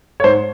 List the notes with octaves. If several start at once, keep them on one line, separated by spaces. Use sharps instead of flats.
C#5
G#2 C5